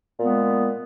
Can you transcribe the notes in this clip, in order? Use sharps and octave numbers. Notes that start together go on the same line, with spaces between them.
A#2 G#3 B3